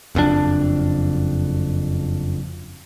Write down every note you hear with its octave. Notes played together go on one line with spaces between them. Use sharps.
F#1 F2 G#2 D4